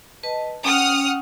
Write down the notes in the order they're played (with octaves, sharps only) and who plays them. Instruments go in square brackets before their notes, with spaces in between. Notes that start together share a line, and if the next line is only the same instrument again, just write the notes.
[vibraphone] B4 D#5 A5
[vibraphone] C#4 G5 [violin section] F#5 D#6 F6